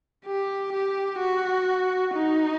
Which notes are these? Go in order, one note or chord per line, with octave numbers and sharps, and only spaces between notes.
G4
G4
F#4
D#4